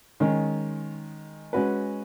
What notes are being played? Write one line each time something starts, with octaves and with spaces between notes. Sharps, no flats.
D#3 G#3 C#4
G#3 C#4 F#4 B4